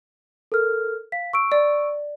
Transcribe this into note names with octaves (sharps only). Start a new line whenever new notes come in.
A4 A#4 F6
F5 B6
C#6 E6 D7
D5